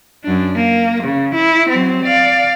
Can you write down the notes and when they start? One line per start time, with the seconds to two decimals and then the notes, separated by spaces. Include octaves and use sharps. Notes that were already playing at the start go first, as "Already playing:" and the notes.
0.24 F#2 D4
0.56 A#3
1.04 C#3
1.35 E4
1.70 F#3 C4
2.04 D5 F5